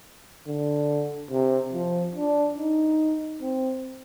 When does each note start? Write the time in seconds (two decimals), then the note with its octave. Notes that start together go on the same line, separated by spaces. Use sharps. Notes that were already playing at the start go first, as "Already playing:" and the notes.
0.47 D3
1.30 C3
1.73 F3
2.16 D4
2.56 D#4
3.42 C4